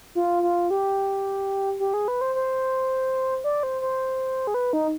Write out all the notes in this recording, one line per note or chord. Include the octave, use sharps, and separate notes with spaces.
F4
F4
G4
G4
G#4
B4
C5
C5
D5
C5
C5
G#4
B4
D#4